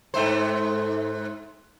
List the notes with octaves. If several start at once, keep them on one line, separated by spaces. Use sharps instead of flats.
G#2 A3 C5